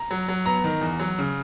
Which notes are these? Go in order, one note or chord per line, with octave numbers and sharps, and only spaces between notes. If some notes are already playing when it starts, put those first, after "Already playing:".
Already playing: A#5
F#3
F#3
B3 A#5
D#3
E2
F#3
C#3